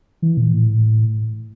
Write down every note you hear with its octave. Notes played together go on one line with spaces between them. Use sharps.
E3
A#2
A2